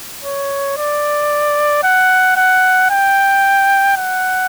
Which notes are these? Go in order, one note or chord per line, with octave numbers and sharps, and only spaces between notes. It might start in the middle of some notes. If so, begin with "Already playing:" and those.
C#5
D5
F#5
F#5
G5
F#5